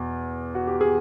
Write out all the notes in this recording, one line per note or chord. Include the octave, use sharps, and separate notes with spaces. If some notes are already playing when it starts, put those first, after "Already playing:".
Already playing: E2 B2
F#4
G4
G#4